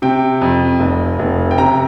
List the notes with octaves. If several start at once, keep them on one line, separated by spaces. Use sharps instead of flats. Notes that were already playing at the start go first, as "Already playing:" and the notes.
C3 G5
F2
F1
F1
G5
C3 A#5